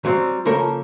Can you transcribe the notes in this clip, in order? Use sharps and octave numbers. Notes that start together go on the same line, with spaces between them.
F#3 G3 C4
C#3 F3 A#3 A4 A#4 C#5